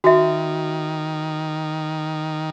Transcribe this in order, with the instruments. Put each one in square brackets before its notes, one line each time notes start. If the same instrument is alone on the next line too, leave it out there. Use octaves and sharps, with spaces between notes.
[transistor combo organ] D#3 [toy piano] F#4 E5